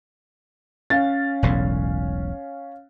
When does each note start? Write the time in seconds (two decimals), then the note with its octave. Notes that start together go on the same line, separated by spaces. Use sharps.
0.90 C#4 F5 A6
1.43 E1 B1 A2